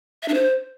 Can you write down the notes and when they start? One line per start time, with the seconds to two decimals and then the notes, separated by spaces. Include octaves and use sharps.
0.23 E5
0.28 D4
0.34 C5